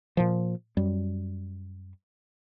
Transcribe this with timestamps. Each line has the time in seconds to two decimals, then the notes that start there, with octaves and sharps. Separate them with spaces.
0.17 A#2 F3
0.77 F#2 G3